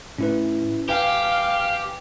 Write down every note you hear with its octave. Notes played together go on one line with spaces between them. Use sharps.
A2 C#4 E4 B4
D#1 G4 B4 F5 G5 G#5